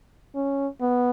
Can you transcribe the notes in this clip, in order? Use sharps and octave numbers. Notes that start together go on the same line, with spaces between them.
C#4
B3